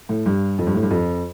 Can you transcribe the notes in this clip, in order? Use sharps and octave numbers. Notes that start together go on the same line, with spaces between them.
A2
G2
F2
G2
A2
G2
F2